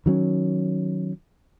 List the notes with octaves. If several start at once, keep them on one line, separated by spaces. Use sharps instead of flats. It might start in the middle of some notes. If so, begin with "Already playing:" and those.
D#3 F#3 C#4